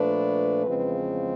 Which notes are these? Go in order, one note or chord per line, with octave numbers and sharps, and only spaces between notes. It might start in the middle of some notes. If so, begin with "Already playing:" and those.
Already playing: A#2 F3 A3 D4 B4
E2 C#3 F3 G#3 C4